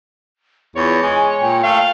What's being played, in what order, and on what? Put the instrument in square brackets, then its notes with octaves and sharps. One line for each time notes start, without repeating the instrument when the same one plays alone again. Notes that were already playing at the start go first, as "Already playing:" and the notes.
[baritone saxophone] E2 [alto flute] F4 [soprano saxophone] C#5
[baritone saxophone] G#3 [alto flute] G#5
[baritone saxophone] A#2 [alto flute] G5
[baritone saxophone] A3 [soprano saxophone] F5